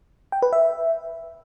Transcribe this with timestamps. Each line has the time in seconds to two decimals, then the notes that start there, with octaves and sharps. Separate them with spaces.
0.32 G5
0.42 B4
0.53 E5